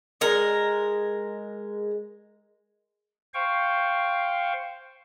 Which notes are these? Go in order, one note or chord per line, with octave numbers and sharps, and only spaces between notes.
G#3 A#4
C5 F5 G5 C#6